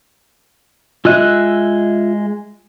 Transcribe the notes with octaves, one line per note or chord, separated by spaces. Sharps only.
G#3 F4 D#5 E5 E6 F#6